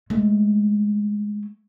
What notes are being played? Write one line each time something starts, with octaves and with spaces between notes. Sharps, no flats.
G#3 A3